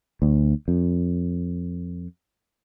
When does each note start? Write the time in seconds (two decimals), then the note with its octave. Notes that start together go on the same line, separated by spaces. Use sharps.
0.22 D2
0.68 F2